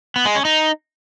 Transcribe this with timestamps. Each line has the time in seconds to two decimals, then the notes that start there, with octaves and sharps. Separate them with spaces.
0.16 B3
0.25 G#3
0.35 C#4
0.45 D#4